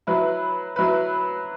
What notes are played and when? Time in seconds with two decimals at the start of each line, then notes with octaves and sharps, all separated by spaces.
0.07 F#3 E4 B4
0.76 F#3 E4 B4